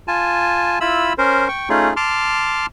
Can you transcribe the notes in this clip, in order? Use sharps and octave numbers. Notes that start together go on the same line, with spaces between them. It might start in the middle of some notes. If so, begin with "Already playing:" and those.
F4 G#5 A5
E4 F4 B5 E6
C#4 A#4 C5
G5 C#6
A3 C#4 D#4 F4 G#4
A5 C6 D6 F6